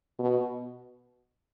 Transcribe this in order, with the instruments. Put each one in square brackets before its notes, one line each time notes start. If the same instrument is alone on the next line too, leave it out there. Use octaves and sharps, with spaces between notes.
[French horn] B2